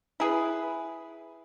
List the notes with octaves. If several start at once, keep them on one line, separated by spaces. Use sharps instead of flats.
E4 G#4 B4